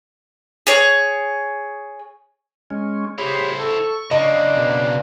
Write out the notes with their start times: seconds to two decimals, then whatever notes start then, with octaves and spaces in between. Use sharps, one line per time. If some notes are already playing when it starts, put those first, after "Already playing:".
0.67 G#4 C#5
2.70 G#3 C#4
3.18 E4 G4 G#4 C5 C#5
3.59 A4 C#6
4.11 C#3 A#3 D4 D#5
4.57 B2 B3